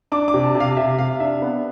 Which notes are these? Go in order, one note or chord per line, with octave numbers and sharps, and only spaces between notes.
D4 D6
D6
C3
A5
C3
F5
C3 E5
C3 F5
D4 E5
B3